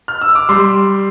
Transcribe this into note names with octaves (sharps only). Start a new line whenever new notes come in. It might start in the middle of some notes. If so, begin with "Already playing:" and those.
F6
E6
D6
G3 C6